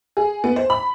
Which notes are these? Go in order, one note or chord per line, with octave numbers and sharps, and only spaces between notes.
G#4
B3
C5
B5